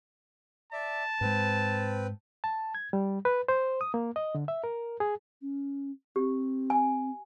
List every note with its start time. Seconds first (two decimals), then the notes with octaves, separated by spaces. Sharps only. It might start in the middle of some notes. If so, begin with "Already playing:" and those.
0.73 D5 E5 A5
1.21 G#2 G#3 C4 B4
2.44 A5
2.75 G#6
2.93 G3
3.25 B4
3.48 C5
3.81 D#6
3.94 A#3
4.16 D#5
4.35 D3
4.48 E5
4.64 A#4
5.00 G#4
5.41 C#4
6.16 C4 G4
6.70 G#5